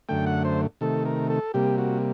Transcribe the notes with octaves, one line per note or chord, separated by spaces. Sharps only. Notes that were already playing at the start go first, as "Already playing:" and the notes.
F#2 D3 A3 G5
F#5
C5
C3 D#3 A3 A4
A#4
A4
C3 G3 A#3 G4
F#4